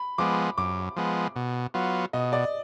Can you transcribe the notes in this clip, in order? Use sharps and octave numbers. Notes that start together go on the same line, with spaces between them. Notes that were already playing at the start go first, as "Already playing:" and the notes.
Already playing: B5
F3 G#3 B3 D6
F#2 D6
F3 G#3 B3
B2
F#3 B3 F4
B2 D#5
D5